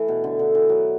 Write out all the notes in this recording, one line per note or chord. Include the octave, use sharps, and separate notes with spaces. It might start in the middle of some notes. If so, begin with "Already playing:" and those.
Already playing: E3 A3
B2
D3
D3
E3
F#3